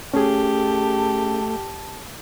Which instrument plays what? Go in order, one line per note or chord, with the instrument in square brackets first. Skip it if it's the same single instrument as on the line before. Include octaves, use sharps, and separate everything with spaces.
[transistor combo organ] A3 [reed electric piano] C#4 G#4 [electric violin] G4 [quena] A5